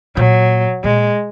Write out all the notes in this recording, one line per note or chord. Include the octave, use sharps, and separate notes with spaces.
A#2 F#3
A#2 G#3